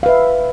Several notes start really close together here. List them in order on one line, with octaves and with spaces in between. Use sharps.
F5 B4 E5